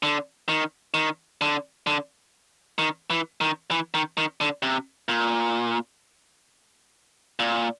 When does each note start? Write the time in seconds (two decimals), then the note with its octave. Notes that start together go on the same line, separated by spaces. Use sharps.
0.03 D3
0.49 D#3
0.94 D#3
1.41 D3
1.87 D3
2.78 D#3
3.10 E3
3.41 D#3
3.71 E3
3.94 D#3
4.17 D#3
4.41 D3
4.62 C3
5.09 A#2
7.39 A#2